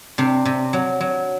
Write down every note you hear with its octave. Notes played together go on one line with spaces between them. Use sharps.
C3 D4
C3
F#3
F#3